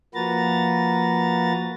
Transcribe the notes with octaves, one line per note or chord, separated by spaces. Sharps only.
F3 A#3 F#4 B4 A#5 A6